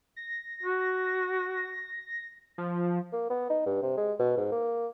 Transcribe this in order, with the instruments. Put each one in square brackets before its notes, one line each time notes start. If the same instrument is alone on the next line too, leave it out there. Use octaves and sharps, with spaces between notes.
[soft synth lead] A#6
[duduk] F#4
[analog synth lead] F3
[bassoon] A#3
B3
D#4
G2
C3
G#3
B2
G#2
A#3